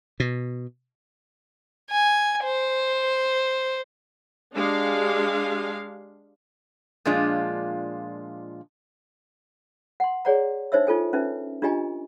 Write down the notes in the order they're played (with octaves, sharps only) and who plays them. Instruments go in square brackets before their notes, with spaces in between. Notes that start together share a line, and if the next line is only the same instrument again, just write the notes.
[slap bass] B2
[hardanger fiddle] G#5
C5
[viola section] G#3 D4 G4 F5
[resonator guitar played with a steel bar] A#2 F3 G#3 D4 F4
[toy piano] F#5 C6
G#4 C#5 D5 F#5 A#5
D4 D#4 C5 C#5 E5 E6
D#4 F4 A4 G#5
C#4 D#4 B4 E5
D4 F4 G4 D#5 G#5 A#5